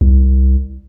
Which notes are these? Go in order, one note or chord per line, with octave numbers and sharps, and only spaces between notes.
C2